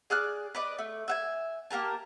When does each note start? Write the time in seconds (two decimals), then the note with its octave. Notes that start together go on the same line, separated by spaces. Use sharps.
0.10 G#4 D5 F6 F#6
0.55 B4 D5 D#5
0.78 A3
1.08 E5 F#5 G#5
1.71 A#3 G4 A#4 A5